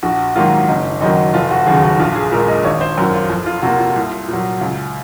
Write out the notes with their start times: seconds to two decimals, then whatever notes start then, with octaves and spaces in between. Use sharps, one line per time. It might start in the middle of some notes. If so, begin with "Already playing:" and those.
0.03 A#1 F#4
0.35 G#2 D#3 F#3 A#3 F4
0.68 F#1 D#4
1.01 F#2 D#3 F#3 D#4
1.34 F1 F4
1.51 F#4
1.66 D#2 C#3 F#3 G#4
1.83 F#4
1.99 A#1 F4
2.15 G#4
2.32 A#2 G#3 A#4
2.48 D#5
2.65 G#1 C#5
2.81 C5
2.98 F#2 F3 A#4
3.14 F4
3.30 F2
3.46 F4
3.62 C3 F3 A#3 F#4
3.79 F4
3.96 C2
4.28 A#2 F#3
4.61 C#2